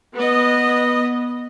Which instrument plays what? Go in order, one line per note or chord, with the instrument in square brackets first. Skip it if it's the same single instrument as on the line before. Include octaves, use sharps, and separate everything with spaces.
[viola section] B3 D#5